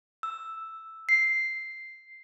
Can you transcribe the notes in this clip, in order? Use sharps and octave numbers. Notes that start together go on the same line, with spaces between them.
E6
C7